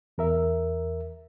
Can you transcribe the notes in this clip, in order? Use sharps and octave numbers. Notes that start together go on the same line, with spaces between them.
E2 A#4 E5